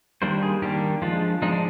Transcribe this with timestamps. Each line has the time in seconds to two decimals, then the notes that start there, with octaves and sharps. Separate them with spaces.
0.22 D#3 G3 A#3 D4 C5
0.43 G#4
0.62 D#3 G3 A#3 D4 G4
1.02 F3 G#3 D4 F4
1.42 F3 G#3 D4 D#4
1.52 D4